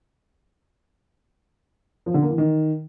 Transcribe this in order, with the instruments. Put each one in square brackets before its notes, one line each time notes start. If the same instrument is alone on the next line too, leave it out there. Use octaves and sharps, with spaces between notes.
[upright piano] F3
D3
A#3
E3
D#3